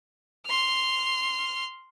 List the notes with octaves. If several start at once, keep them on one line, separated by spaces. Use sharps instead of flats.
C6 F6